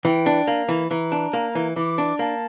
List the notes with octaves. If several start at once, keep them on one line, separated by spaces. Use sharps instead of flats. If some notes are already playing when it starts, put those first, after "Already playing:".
E3 G5
D4
A#3
E3
E3 A#5
D4
A#3
E3
E3 D6
D4
A#3 A5